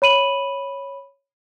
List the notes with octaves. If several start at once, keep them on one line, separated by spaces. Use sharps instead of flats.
C#5 B5 D#7 F#7